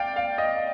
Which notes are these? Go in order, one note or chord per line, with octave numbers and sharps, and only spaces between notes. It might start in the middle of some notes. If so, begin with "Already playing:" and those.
Already playing: D5 F5 G5
F5
D#5